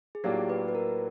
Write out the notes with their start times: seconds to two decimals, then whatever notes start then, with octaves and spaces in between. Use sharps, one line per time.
0.15 G#4
0.24 A2 F#3 A#3 D4 F4 G4
0.49 B4
0.68 B4
0.75 A#4